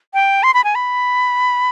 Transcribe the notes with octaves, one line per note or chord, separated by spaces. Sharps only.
G5
C6
B5
G#5
B5